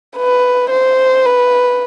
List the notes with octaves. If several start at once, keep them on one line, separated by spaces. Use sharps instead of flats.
B4
C5
B4